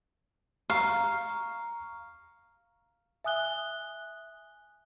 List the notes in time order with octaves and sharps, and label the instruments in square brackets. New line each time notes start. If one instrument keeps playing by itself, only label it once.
[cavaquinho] F5 [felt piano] A#5 C#6
[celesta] E5 G#5 D#6 F#6 G7